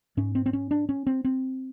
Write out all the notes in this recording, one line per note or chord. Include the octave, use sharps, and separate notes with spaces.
G#2 C#4
C4
C4
C#4
D4
C#4
C4
C4